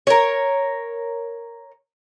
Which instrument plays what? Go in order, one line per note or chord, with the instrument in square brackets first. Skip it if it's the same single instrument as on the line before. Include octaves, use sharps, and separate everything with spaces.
[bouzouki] A#4 C#5